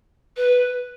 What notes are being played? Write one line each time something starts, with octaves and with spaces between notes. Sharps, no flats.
B4